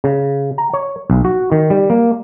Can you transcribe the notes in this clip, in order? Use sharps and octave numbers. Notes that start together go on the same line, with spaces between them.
C#3
A#5
C#5
B1
F#4
D#3
G3
A#3